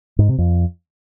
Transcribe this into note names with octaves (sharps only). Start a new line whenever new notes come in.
G#2
C3
F2